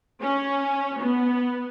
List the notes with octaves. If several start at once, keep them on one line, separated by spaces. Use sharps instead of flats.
C#4
B3